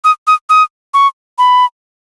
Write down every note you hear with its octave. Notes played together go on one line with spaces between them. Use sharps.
D#6
D#6
D#6
C#6
B5